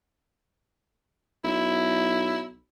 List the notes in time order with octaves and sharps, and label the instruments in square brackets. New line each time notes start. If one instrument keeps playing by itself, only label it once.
[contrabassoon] B1 [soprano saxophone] E4